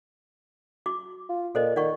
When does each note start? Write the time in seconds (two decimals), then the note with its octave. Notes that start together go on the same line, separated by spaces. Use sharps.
0.86 F#4 D6
1.29 F4
1.55 A#2 A4 C5 D#5
1.76 D#3 D5 F#5 C#6